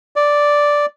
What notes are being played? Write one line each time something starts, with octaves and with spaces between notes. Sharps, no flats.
D5